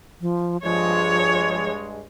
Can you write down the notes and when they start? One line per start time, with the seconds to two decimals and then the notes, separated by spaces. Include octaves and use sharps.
0.21 F3
0.64 G2 F3 G#3 C#5